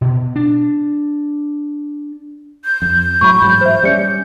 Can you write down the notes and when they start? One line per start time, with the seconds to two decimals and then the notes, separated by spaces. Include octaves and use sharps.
0.01 B2
0.36 D4
2.65 G6
2.82 F2
3.21 A2 F#3 B5 C#6
3.42 A1 G#2 F#3
3.61 C5 E5
3.83 G3 B3 C#4 D5 C#7